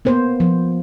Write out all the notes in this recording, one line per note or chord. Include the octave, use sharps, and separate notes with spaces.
A#3 B3 C5
F3